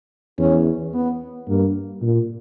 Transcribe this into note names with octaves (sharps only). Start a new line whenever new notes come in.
E2 C#4
B3
G2 A#3
A#2